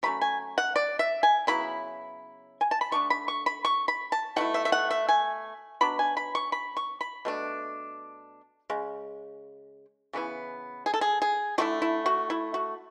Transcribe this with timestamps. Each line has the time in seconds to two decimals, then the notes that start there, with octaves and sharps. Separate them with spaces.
0.03 F#3 A3 C#4 B5
0.21 G#5
0.58 F#5
0.76 D5
0.99 E5
1.23 G#5
1.47 C#3 F#3 B3 E4 B5
2.61 G#5
2.71 A5
2.81 B5
2.92 D3 A3 D4 C#6
3.10 B5
3.28 C#6
3.46 B5
3.65 C#6
3.88 B5
4.12 A5
4.36 B2 A3 E4 F#5
4.54 E5
4.65 E5
4.72 F#5
4.90 E5
5.08 G#5
5.81 B2 F#3 B3 D4 B5
5.99 G#5
6.17 B5
6.35 C#6
6.52 B5
6.77 C#6
7.01 B5
7.25 B2 A3 D4
8.70 C#3 G#3
10.13 C#3 E3 B3 E4
10.86 G#4
10.94 A4
11.01 G#4
11.22 G#4
11.58 D3 A3 E4 F#4
11.82 E4
12.06 F#4
12.30 E4
12.54 F#4